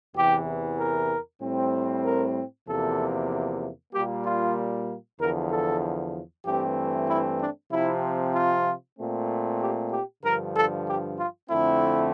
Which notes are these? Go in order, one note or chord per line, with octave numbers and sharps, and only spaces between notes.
E2 C3 E3 G4
A#4
A2 G3 C4
A#4
E2 C3 F3 A#3 A4
A#2 G3 A#3 G4
F4
E2 D3 F3 A#4
A4
G2 E3 A3 C4 G4
E4
D4
C3 F3 C4 E4
F4
A#2 A3 C4
G4
G4
G2 D3 F3 A#4
A4
G4
F4
F2 D3 A3 C4 E4